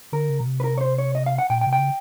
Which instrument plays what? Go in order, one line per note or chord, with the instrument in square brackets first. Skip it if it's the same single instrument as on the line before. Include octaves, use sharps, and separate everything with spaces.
[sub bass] D3 [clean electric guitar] A#4
[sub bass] C#3
B2
C3
[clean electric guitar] B4
A#4
C#5
C5
C#5
D#5
F5
F#5
[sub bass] A#2 [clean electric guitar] G5
[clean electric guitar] G5
[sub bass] C3
[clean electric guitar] G5
[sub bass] C#3